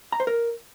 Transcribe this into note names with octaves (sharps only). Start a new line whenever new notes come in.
A#5
C5
A#4